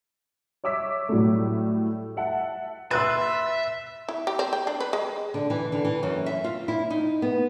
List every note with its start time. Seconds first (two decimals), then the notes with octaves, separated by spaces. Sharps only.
0.64 C#5 E5 D6 E6 B6
1.09 A2 F#3 G3 A3
2.17 E5 F#5 A5
2.91 B4 E5 C6 E6 F#6 A6
4.09 E4
4.27 G4
4.39 C4
4.53 G5
4.67 D4
4.80 B4
4.93 G#3
5.34 D3
5.50 E3
5.72 D3
5.85 E3
6.03 F#2
6.26 E5
6.44 F4
6.68 E4
6.90 D#4
7.22 B3